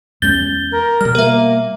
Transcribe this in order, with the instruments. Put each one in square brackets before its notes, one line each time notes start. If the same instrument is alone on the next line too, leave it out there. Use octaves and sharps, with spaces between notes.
[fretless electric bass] E2 G#3 C#4 [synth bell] G6 A6 G7
[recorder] A#4
[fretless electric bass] B2 G3 [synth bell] F6
[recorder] A#3 [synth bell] A#4 E5